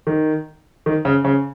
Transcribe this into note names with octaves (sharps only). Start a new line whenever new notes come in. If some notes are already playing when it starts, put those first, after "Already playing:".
D#3
D#3
C#3
C#3